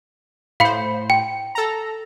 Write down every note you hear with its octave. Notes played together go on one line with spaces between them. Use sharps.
A2 C5 F5 B5 C#7
G5
A4 A#5